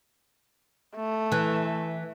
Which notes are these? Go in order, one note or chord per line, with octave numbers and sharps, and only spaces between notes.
A3
E3